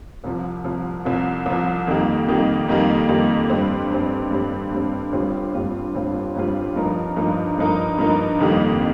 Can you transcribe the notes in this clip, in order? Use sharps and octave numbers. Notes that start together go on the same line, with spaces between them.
C2 C3 F3
C2 C3 F3
C2 C3 F3
C2 C3 F3
F2 D#3 G3 A#3
F2 D#3 G3 A#3
F2 D#3 G3 A#3
F2 D#3 G3 A#3
G2 G3 C4
G2 G3 C4
G2 G3 C4
G2 G3 C4
G1 G2 G3 C4 F4
G1 G2 G3 C4 F4
G1 G2 G3 C4 F4
G1 G2 G3 C4 F4
G2 F3 D#4 A#4
G2 F3 D#4 A#4
G2 F3 D#4 A#4
G2 F3 D#4 A#4
F1 F2 D#3 G3 A#3